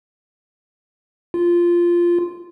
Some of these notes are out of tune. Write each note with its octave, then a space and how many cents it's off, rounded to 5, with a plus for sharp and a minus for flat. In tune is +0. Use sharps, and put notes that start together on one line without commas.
F4 -10